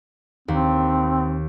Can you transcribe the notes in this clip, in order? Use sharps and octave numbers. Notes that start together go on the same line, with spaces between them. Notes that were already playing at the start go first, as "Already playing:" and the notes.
D#2 C4